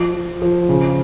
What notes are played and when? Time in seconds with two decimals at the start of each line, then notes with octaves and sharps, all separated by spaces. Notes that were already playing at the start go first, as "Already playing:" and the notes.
Already playing: F3
0.14 F3
0.42 F3
0.69 C#3